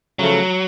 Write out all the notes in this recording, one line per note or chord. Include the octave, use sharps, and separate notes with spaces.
C#3 F3 F#3 A3